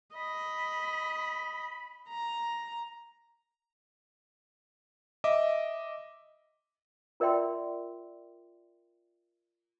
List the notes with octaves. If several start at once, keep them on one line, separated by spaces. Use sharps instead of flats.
D#5 B5
A#5
D#5 E5 D6
F4 A#4 D5 E5 G5 C6